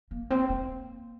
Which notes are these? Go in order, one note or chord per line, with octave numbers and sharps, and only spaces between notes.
A#3
C4
A#3